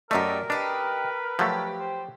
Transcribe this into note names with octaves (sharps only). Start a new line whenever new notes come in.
F#2 A3 D#4 G4 A#4 D5 E5
D4 D#4 G4 B4
F3 F#3 A3 G4
C5